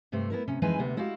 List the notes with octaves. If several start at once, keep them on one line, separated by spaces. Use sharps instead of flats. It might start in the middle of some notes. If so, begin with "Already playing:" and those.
G2 C3 A3 C5
B3 E4 A#4
C3 C#4
F2 E3 G#3 D#4 B4 G#5
D2 C3 B3
G#3 E4 F#4 G4 F5